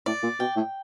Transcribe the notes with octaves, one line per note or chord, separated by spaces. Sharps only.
A2 D5
A#2
B2 G5
A2